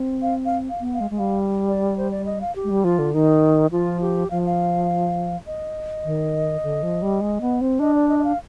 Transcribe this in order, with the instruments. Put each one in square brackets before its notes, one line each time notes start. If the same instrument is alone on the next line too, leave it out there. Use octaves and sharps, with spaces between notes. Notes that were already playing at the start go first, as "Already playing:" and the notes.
Already playing: [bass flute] C4
[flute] F5
F5
F5
[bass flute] B3
[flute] F5
[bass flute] G#3
G#3
[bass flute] G3 [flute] F5
[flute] D5
C5
D5
D#5
F5
G4
[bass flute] G#3
G3
[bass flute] F3 [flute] F4
[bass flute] D3
[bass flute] D#3 [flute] D#4
[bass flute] F3 [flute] F4
[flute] G4
[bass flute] F3 [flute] F5
[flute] F5
D#5
[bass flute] D#3
D3
F3
G3
G#3
B3
C4
[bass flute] D4 [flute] D#5
[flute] D5
D#5
D#5
F5